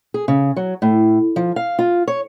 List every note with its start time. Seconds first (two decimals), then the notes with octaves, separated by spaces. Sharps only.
0.14 G#4
0.28 C#3
0.57 F#3
0.82 A2
1.36 F3
1.56 F5
1.79 F4
2.08 C#5